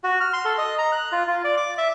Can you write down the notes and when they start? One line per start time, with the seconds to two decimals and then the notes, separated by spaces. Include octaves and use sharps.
0.04 F#4
0.20 F6
0.33 C6
0.45 A4
0.58 D#5
0.78 A#5
0.92 F#6
1.12 F4
1.27 F4
1.44 D5
1.57 D6
1.78 E5